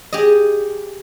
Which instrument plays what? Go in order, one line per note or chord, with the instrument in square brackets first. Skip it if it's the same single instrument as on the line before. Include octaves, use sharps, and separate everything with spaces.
[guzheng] G4 G#4 D#5